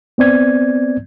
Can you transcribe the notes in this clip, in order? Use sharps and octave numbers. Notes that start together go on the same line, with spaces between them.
B3 C4 D5 G#6